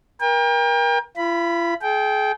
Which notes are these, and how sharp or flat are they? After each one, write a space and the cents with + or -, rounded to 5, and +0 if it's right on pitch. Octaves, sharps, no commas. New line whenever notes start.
A#4 +30 G5 +35
F4 -45 B5 +0
G#4 +40 G5 -5